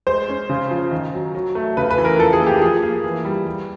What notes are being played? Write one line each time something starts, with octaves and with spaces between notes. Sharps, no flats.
G#3 C5
C#4
C#3
F3
D#3
F#3
F#3
A3
C#3 B4
B4
E3
A#4
F3 A4
G#4
A#3
G4
F3 G#4
A#3
E3
G3
G3